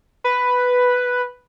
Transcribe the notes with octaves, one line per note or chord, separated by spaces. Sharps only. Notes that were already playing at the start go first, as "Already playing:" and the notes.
B4